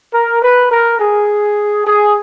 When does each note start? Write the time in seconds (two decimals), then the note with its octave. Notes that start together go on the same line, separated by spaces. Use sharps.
0.14 A#4
0.42 B4
0.71 A#4
1.00 G#4
1.85 G#4